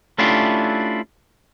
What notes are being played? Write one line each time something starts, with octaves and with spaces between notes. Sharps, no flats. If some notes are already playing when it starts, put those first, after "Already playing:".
A3 C#4 D4 E4 F4 G4